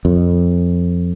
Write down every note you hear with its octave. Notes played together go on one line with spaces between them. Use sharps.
F2